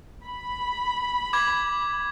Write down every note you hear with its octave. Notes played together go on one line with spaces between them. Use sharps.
B5
D6 G#6